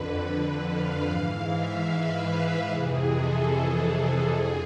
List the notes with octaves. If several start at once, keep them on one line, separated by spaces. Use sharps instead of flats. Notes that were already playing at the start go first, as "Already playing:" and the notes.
Already playing: F2 D3 B4
F5
G#2 E3
E5
B4
F2 C3 E3 G#4
A4
G#4
G#4
F2 D3 G#4